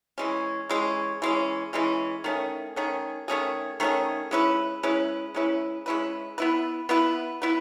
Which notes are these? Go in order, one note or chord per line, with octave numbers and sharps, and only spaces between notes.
E3 G#3 C#4
E3 G#3 C#4
E3 G#3 C#4
E3 G#3 C#4
D#3 A3 C#4 G#4
D#3 A3 C#4 G#4
D#3 A3 C#4 G#4
D#3 A3 C#4 G#4
G#3 C#4 E4 B4
G#3 C#4 E4 B4
G#3 C#4 E4 B4
G#3 C#4 E4 B4
B3 E4 B4
B3 E4 B4
B3 E4 B4